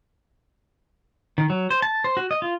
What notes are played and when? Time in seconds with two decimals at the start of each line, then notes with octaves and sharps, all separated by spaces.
1.38 D#3
1.50 F#3
1.70 C5
1.82 A5
2.04 C5
2.17 F#4
2.31 D#5
2.42 F4